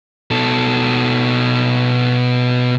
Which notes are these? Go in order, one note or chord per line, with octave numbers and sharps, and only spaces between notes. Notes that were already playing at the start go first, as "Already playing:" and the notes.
B2 A4